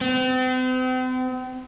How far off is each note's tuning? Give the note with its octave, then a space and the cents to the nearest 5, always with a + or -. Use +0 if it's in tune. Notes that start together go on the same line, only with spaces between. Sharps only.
C4 -40